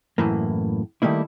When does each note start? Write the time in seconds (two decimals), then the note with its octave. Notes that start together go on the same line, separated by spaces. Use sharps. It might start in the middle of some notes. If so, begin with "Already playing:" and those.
0.18 F#2 A2 E3 A#3
1.02 D#3 G3 A3 A#3 E4